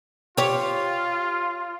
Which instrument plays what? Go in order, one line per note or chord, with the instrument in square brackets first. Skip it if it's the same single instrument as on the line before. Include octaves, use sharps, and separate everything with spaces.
[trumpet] F4 [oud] G4 C#5